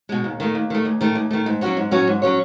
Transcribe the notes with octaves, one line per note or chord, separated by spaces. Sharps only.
B2 G#3
D#2
D#3 A3
D#2
D#3 A3
D#2
D#3 A3
D#2
D#3 A3
G#2
F#3 C#4 F#4 C#5
G#2
F#3 C#4 F#4 C#5
G#2
F#3 C#4 F#4 C#5